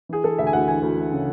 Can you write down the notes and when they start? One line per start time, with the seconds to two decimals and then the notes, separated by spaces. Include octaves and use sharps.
0.09 E3 G#4
0.24 E3 A4
0.38 D2 E5
0.47 G#5
0.53 D2 F#5
0.68 E3 G#5
0.82 D2
0.98 E3
1.12 C#3